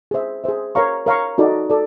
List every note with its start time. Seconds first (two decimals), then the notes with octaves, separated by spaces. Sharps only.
0.11 G#4 C5 E5
0.44 G#4 C5 E5
0.75 A#4 C#5 F5 A#5 C#6
1.06 A#4 C#5 F5 A#5 C#6
1.38 D#4 F#4 A4 D5
1.70 A4 D5